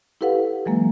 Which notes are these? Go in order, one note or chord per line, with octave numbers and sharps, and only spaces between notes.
E4 G4 A4 B4 F5 F#5
E3 F#3 G#3 A#3